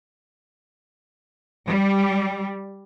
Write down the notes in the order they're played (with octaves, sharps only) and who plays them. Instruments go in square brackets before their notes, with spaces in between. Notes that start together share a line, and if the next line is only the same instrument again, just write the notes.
[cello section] G3